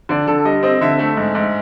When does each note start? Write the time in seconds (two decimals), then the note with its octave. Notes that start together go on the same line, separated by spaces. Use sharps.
0.09 D3 D5
0.27 D3 A4
0.45 G3 D#5
0.63 C4 D#5
0.81 D3 E5
0.98 A3 E5
1.17 G#2
1.35 G#2